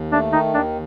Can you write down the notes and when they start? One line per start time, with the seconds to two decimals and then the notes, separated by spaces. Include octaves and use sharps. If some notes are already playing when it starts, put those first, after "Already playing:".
Already playing: D#2
0.12 A3 D4
0.32 D#3 D#4
0.53 D#2 D4